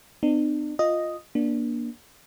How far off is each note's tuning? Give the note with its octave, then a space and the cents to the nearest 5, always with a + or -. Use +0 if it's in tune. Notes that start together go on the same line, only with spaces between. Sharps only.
B3 +45 D4 +45
F4 +0 D#5 +0
A#3 +30 D4 +0